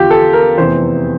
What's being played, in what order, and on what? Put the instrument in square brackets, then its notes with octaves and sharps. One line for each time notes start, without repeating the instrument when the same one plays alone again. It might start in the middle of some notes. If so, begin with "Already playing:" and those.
Already playing: [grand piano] E2 D3 F3 F4 G4
A4
A#4
F1 E2 C3 E3 C5